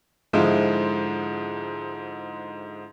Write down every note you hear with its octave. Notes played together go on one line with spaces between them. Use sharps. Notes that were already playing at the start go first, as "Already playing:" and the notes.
G#2 D3 F3 G#3 E4 F4